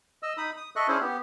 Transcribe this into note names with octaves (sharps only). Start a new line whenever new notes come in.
D#5 E6
D#4 B5 D#6
D#6
A4 D#5 E5 C#6 F#6
C#4 D4 E4 G#4 C5
B3 G4